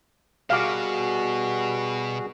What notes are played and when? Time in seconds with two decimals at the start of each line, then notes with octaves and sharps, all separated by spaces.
0.50 B2 G3 F#4 G#4 F5 D6